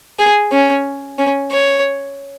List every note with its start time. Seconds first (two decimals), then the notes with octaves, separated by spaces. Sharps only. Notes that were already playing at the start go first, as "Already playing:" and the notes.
0.19 G#4
0.52 C#4
1.18 C#4
1.51 C#5